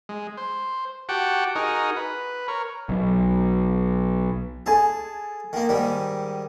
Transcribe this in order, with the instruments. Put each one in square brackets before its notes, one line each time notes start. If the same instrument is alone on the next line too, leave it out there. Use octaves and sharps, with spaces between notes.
[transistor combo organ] G#3
C5
F#4 G4 F#5 G5 A5
D#4 F#4 G#4 A#4 D#5
B4
A#4 C#5
[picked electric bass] B1
[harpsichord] G#4 A5 [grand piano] A4 G#5
[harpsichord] D#3 A#3
G#2 D#3 G3